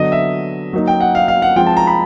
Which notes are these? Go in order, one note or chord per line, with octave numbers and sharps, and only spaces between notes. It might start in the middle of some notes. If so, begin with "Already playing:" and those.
Already playing: D3 F#3 B3 D#5
E5
F#3 A#3 D#4
G5
F#5
F5
F5
F#5
F3 G#3 C4 F4 G5
A5
A#5
B5